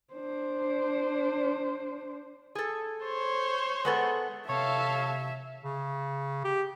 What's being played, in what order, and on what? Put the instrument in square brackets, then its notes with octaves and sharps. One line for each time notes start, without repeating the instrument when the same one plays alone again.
[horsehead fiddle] D4 C5
[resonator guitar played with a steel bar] G#4 A4
[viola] C5 C#5
[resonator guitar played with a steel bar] G#3 B3 A4
[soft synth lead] C3 [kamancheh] A4 F5 [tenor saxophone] C#5 [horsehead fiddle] E5
[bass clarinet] C#3
G4